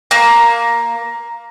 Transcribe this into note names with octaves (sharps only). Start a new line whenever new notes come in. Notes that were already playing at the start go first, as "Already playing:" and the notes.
A#3